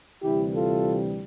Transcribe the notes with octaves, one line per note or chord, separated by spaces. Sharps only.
D2 C3 E3 G3 E4 G4
F4 A4